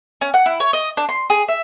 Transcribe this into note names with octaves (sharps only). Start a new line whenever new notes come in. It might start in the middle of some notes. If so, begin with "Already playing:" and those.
C#4
F#5
E4
C#5
D#5
D4
C6
G#4
E5